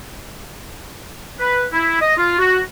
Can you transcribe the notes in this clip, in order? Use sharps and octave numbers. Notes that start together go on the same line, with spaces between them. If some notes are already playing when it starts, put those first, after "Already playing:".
B4
E4
D#5
F4
F#4